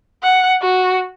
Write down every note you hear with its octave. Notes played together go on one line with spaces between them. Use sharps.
F#5
F#4